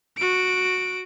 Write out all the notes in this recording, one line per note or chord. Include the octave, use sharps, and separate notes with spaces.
F#4 D7